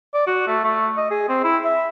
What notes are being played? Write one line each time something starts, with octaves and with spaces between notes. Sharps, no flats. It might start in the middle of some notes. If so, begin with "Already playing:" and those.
D5
F#4
A3
A3
D#5
G#4
C4
E4
E5